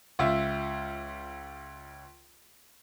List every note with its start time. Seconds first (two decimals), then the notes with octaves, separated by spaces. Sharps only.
0.19 C#2 F4 E5